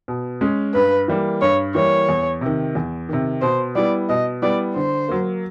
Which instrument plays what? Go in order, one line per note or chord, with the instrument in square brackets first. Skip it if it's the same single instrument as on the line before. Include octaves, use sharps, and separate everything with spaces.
[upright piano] B2
G#3 C#4
[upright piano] G2 [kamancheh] B4
[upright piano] E3 G3 A#3
[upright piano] G2 [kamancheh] C#5
[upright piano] E3 G3 A#3 [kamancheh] C#5
[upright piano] E2
C3 D#3
E2
C3 D#3
[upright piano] B2 [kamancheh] C5
[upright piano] G3 B3 E4 [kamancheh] D5
[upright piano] B2 [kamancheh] D#5
[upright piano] G3 B3 E4 [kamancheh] D5
[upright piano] D3 [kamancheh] C5
[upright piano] F#3 A#3